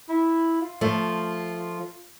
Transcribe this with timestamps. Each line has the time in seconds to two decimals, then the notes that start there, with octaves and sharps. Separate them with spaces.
0.09 E4
0.61 F4
0.81 F3 A3